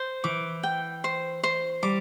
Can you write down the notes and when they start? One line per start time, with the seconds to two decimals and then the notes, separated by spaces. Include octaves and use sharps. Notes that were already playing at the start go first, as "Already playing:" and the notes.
Already playing: C5
0.24 E3 D6
0.63 G5
1.04 C5
1.43 C5
1.83 G3 D6